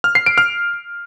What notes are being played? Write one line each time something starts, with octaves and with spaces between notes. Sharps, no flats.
F6
C7
D7
F6